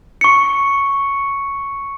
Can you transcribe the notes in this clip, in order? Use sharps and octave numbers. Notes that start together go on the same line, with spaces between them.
C#6 C#7